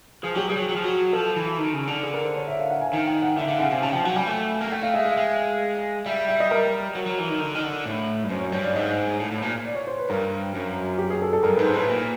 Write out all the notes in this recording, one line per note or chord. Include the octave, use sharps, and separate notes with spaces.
F3 G#4
F#3 G4
G3 G#4
F#3
F#3
F3
F#3
F3 A4
E3
D#3
C#3
D3
G#4
A#4
C5
C#5
E5
F5
F#5
G#5
D#3 G#5
G5
F#5
D3 E5
D3 F5
C#3 F#5
C3 G#5
C#3 A5
F3 G5
F#3 F#5
G3 G#5
A3
A#3
A3 G5
F5
G#3 E5
E5
G#3
G3 E5
E5
D#5
A#4
F#3
F#3
E3
D#3
D3
D#3
D3
A2
G2
F#2 C5
C#5
G2 C#5
D5
G#2 D#5
A2
A2
A#2
D5
C#5
C5
B4
G2 A#4
F#2
G4
G#4
A4
A4
G2 A#4
B4
G#2
C5
A2 B4
A#2